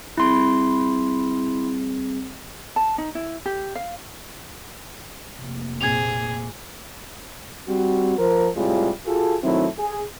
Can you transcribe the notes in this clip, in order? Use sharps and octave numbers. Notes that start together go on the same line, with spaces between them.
G3 C4 E4 G#4 C6
A5
D#4
E4
G4
F5
F1 C3 A#3
A#2 C4 G#4 G#6 F7
G3 C4 F#4
F3 A#4 C5
A2 C3 G3 G#3 F4
F4 F#4 G#4 A4
D#3 F#3 A3 C4 E4
G#4